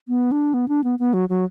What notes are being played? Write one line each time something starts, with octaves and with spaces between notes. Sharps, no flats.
B3
D4
B3
D4
B3
B3
F#3
F#3